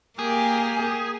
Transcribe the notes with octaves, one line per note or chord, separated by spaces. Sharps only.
A#3 G4 G#4